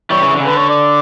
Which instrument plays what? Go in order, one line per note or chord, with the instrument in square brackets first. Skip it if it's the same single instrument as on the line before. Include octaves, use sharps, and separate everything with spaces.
[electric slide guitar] E3 G3 [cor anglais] C#5
[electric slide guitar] C#3 E3
D3
C#3
[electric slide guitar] D3 [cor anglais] B4
[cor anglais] C#5
D5